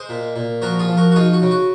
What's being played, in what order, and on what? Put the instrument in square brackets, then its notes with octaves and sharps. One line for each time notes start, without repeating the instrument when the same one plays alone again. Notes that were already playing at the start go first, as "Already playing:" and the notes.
Already playing: [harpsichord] G#3 G#4 C5
A#2
A#2
F3 F#4 A#4
F4 G#4
F3
F#4 A#4
F#4
D#4 F4 G#4
F#4
C#3
F#4